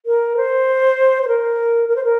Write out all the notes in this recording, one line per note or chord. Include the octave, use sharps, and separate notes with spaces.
A#4
C5
C5
A#4
A#4
C5
A#4